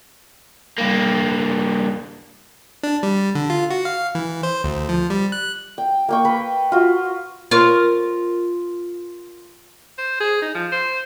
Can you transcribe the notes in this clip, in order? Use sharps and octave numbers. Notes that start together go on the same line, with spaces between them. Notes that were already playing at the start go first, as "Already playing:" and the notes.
G2 A#3
D4
G3
D3
F4
F#4
F5
E3
C5
D2
F3
G3
F#6
G5
A#3 G5 C#6
B4
F4 F#4
F4 A#4 C#5
C5
G#4
D#4
F3
C5